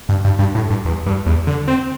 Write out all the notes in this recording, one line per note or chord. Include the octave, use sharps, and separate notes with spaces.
G2
G2
G2
A2
G2
E2
G2
E2
D3
C4